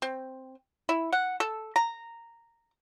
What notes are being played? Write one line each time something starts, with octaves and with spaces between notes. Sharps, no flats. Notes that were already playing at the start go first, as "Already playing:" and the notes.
C4
E4
F#5
A4
A#5